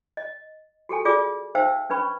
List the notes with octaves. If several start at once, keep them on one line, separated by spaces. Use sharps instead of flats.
D#5
F#4 G4 A4 G#5
F4 G#4 A4 D5 D6 D#6
D#4 C5 E5 F5 G5 E6
C#4 D4 B4 B5 C#6